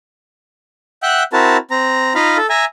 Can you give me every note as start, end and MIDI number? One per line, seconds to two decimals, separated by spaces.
1.03 1.23 76
1.03 1.23 78
1.03 1.23 79
1.03 1.23 90
1.33 1.57 60
1.33 1.57 64
1.33 1.57 66
1.33 1.57 70
1.33 1.57 81
1.71 2.14 60
1.71 2.14 82
2.15 2.37 63
2.15 2.37 65
2.15 2.37 77
2.15 2.37 82
2.15 2.37 83
2.37 2.47 69
2.50 2.65 76
2.50 2.65 80
2.50 2.65 82